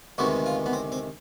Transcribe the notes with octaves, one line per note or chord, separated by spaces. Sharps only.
D2 C3 D#3 G#3 B3 F#4
F4
B3
C4
C4